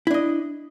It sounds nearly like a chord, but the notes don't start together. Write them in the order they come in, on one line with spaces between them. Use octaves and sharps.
E4 D4 D#5